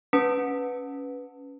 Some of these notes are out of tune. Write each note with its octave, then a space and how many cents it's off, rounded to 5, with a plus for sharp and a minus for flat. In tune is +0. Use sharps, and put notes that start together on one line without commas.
C#4 +0 B4 +0 A5 +20